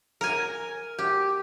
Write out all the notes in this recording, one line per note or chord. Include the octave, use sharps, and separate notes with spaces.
A#4 G#5
G4